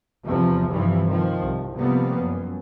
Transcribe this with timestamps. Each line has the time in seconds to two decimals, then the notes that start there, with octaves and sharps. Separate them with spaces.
0.25 E2 C3 F3
0.69 G2 C3 E3 F3
1.07 D#3 F3
1.41 C2
1.76 C3 F3 G3 A#3 B3
2.19 F#2